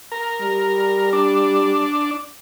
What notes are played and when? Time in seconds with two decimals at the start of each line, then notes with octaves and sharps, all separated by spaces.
0.12 A#4
0.40 G3
1.13 D4